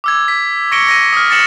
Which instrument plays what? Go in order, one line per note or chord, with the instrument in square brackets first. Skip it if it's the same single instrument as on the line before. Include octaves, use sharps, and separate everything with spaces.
[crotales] D6 E6 G#6
B6
C#6 A#6 C#7 D7 G7
A#6 D#7
D#6 F6
A6 A#6 C#7 E7 F#7